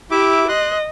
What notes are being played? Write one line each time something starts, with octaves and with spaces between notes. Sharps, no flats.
E4 G4 E5 D6
D#5 C6 F#6